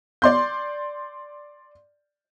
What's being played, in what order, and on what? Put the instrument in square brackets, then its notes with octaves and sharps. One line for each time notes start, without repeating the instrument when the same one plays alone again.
[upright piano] D5 C6 G6